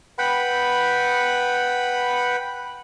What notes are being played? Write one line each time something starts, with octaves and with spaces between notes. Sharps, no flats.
B4 F#5 G5 B5